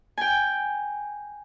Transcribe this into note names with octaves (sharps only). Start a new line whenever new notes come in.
G5 G#5